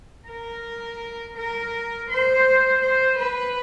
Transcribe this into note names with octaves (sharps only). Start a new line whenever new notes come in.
A#4
A#4
C5
C5
B4